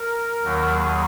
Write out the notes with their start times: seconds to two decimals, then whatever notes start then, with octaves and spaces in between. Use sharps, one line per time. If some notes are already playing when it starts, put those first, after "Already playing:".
Already playing: A#4
0.43 D#2 D#3 F#3
0.72 G#4